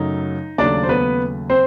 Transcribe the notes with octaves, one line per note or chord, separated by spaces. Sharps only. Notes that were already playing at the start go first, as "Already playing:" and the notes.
Already playing: F#2 C#3 F#3 A3 D#4
D#2 C#3 F#3 A3 D4 D5
C5
B3 B4
C4 C5